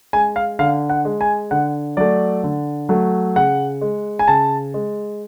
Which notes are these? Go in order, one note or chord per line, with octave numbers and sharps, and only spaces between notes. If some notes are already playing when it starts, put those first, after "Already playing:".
G#3 G#5
F5
D3 F5
F#5
G#3
G#5
D3 F#5
F#3 A3 D5
D3
F#3 A3
C#3 F#5
G#3
G#5
C#3 A5
G#3